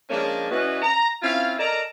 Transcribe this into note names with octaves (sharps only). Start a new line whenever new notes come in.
F3 G#3 A#3 C#4 D4
E3 C#4 F#4 B4 D5 D#5
A#5
C4 C#4 E4 F4 F5
A4 A#4 D5 D#5 A#5